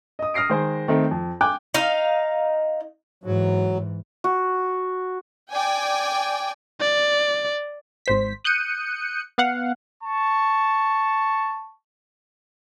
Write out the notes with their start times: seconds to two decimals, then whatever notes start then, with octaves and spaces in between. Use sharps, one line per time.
0.19 D#5 D#6
0.34 D#6 F6 A#6 C7 D7
0.49 D#3 G#3 G#4 C5
0.88 D#3 A3 C4 D#4
1.11 F2
1.41 G5 G#5 D6 F#6
1.74 D#4 F5
3.24 G#2 E3 F#3
4.24 F#4
5.52 D5 G5 G#5
6.81 D5
8.06 G#1 C5 B6
8.44 D#6 F#6 G6 C#7 D#7
9.38 B3 F5 F#5
10.02 A5 C#6